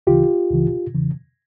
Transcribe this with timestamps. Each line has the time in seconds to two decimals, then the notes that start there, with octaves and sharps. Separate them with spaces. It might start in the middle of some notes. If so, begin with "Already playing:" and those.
0.07 D2 C#3 E3 F4 G4
0.51 C#2 C#3 E3
0.95 E2 C#3 E3